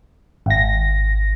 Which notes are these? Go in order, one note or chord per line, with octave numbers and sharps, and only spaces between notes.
G#1 A#6